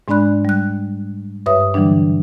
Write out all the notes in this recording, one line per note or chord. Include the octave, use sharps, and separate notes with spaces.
G#2 G#3 D4 D5 B5 F#6
G3 F#6
G2 B4 C#5 E5 D#6
D3 E3 F#3 G3 D4